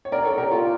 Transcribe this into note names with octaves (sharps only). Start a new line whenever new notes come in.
C#5
A#4 D5
A4 C#5
G4 A#4
F4 A4